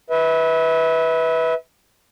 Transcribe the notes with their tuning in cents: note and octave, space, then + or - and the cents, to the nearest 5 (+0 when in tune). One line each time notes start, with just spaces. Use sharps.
B4 +0 E5 -30